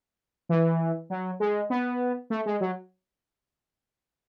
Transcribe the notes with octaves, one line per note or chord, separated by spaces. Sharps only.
E3
F#3
G#3
B3
A3
G#3
F#3